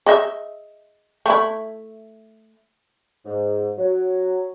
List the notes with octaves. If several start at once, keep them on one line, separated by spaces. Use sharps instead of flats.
G#4 D#5 E5
A3 E4
G#2
F#3